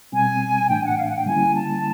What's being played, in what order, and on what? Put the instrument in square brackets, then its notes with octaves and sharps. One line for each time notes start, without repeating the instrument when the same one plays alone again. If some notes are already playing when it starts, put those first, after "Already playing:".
[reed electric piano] B2 G3 C4 [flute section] G#5
[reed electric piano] A2 E3 A3 D4 [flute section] G5
[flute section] F#5
F5
F#5
G5
[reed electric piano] D3 G3 A#3 C#4 E4 [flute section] G#5
[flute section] A5